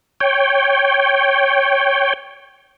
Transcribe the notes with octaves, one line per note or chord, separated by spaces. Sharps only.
C#5 G5